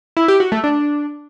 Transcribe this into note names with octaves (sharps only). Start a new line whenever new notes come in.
E4
G4
F#4
A3
D4